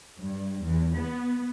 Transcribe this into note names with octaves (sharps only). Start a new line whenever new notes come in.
G2
E2
B3